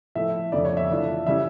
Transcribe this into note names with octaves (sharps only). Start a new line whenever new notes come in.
A2 F3 A3 E5
F2 D3 A3 D5
C#5
E5
E3 A3 D4 F4
E3 G3 C#4 E5